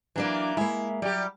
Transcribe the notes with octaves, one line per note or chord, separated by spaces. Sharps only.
E3 F#3 A#3 D4 D5
G#3 A#3 E4
F#3 G3 G4